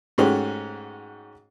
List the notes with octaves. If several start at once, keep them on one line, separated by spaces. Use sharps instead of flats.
G#2 G#3 A3 C#4 F#4 G4